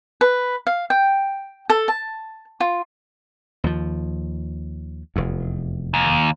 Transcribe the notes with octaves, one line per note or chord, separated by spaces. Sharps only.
B4
F5
G5
A4
A5
F4
D#2 F3
F1 E2
D#2